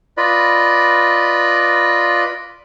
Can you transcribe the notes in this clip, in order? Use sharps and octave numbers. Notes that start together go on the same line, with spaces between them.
F4 B4 D5 D#5 B5